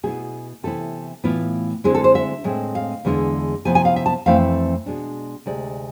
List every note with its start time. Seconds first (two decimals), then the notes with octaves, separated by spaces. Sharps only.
0.03 B2 B3 E4 G#4
0.63 C3 E3 B3 E4 A4
1.24 A2 E3 B3 E4 F4
1.84 D3 G#3 C4 E4 G#4
1.94 A4
2.04 C5
2.15 E5
2.44 A2 G#3 C4
2.75 F5
3.05 E2 D3 G#3 B3 E4
3.65 C3 F3 B3 E4 G#5
3.75 G#5
3.85 F5
3.96 E5
4.06 A5
4.26 F2 E3 A3 C4 E4 F5
4.86 B2 G#3 D4
5.46 D2 C3 G#3 D5